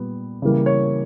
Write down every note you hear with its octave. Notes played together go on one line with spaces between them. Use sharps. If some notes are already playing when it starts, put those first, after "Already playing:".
Already playing: A#2 G3 B3
C#3 E3 G3 A#3
C#5